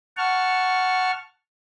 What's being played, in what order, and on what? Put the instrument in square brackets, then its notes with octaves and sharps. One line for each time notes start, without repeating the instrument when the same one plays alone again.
[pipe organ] F#5 A5 C#6 F6